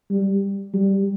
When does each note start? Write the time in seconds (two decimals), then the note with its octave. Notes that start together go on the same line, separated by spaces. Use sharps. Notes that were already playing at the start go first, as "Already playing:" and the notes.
0.10 G3
0.74 G3